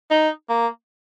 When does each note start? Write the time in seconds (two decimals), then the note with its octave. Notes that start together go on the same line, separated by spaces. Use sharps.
0.11 D#4
0.49 A#3